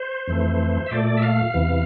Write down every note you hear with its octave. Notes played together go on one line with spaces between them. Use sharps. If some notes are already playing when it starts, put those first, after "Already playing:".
Already playing: C5
F2 E3 A3
E5
A#2 A3 D5
E5
F5
E2 C3 E3